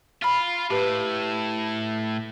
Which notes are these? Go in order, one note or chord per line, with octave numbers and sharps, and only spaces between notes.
F4 B5 F6
A2 G4 B4